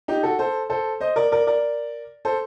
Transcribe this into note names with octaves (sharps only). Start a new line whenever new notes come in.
D#4 G4
F#4 A4
A4 C5
A4 C5
C5 D#5
A#4 D5
A#4 D5
A#4 D5
A4 C5